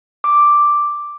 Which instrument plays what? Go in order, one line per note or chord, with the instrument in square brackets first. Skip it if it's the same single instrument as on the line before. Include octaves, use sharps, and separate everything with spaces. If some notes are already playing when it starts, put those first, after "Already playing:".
[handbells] D6